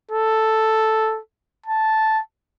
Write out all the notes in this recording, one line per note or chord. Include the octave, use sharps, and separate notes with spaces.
A4
A5